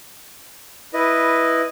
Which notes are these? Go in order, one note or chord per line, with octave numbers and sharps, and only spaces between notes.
E4 B4 D#5